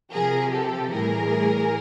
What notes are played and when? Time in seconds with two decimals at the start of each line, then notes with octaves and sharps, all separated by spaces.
0.12 C3 F3 G#4 A#4
0.52 G4 A4
0.92 A2 E3 G3 G#4 A#4